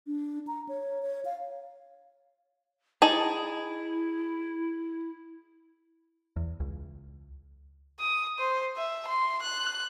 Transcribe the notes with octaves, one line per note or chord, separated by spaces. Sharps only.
D4
A#5
C#5
C#5
F5
D#4 E4 G#4 A5
E2
C#2
D#6
C5
E5
C6
F#6